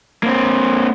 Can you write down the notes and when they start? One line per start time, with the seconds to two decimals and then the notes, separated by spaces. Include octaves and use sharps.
0.23 A#3 C4